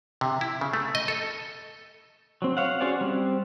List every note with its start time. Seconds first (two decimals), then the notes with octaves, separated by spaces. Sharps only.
0.21 C3
0.41 E4
0.61 C#3
0.73 A3
0.95 D#5
1.08 A4
2.42 F#3 C4
2.57 C#5 F5 F#5
2.81 C#4 F#4 G#4 C5 D5
3.01 G3 C4